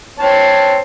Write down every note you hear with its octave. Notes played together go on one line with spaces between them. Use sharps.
C4 C#5 A5